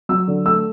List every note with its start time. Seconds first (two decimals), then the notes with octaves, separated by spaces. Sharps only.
0.09 F#3 E6
0.28 D3
0.45 A3 E6